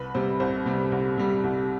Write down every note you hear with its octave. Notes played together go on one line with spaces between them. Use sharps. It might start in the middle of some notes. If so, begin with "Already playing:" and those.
Already playing: C2 B4
C3 G3 C5
C2 C5
C3 G3
C2
C3 G3
C2